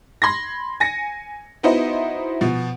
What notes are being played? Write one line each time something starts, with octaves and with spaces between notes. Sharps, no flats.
B5 C6 G#6 A#6
G#5 A#6 C#7
B3 D#4 E4 F#4 C5 D#5
B2 F3